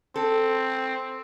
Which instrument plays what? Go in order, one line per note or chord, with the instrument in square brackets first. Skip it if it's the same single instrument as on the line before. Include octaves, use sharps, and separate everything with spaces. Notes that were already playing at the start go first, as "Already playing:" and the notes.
[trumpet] C4 [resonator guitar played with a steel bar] A4